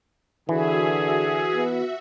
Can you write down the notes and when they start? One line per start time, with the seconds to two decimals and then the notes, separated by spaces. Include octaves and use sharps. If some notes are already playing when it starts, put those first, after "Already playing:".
0.49 D3 E3 F#4 G#4 E5
1.54 B3